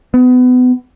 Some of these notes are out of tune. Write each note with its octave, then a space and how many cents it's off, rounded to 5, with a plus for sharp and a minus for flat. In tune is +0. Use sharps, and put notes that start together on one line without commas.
B3 +25